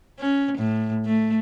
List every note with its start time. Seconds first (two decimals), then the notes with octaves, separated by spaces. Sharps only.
0.19 C#4
0.58 A2
1.05 A3